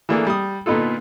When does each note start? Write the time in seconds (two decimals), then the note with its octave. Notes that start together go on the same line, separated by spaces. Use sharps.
0.09 E3 A3 A#3 D4 G#4 A4
0.27 G3 D#6
0.66 A#2 D3 B3 D#4 F4 A4